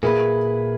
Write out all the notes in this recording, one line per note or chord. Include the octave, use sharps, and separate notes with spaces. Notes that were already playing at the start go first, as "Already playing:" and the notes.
A#2 A#3 E4 G#4 B4